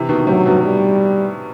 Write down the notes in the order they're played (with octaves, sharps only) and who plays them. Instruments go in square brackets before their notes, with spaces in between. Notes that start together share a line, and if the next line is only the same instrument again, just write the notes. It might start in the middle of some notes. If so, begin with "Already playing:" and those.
Already playing: [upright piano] C3 E3
B2 D#3
[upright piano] A2 C3 [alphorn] F#3
[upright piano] G2 B2
[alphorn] G3